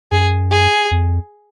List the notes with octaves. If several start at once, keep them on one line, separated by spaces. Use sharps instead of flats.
F#2 G#4
G#4
F2